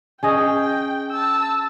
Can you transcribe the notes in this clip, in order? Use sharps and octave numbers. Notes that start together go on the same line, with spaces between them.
C#4 G#4 D#5 G5
A5 E6